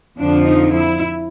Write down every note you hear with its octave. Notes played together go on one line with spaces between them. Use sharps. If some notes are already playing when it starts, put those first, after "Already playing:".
F2 D3 F3 D4
D#4
E4